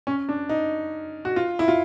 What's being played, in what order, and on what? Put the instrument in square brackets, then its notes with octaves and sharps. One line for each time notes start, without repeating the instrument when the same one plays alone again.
[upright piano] C#4
D4
D#4
F#4
F4
E4
F4